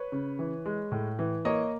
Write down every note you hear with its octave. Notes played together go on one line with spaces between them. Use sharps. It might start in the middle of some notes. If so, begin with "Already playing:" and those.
Already playing: B4 C#5
C#3
E3
G#3
A2
E3
A#3 C#5 D#5